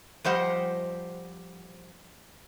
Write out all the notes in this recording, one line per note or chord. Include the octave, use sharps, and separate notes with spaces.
F3 G3 G4 C5 D#5 F#5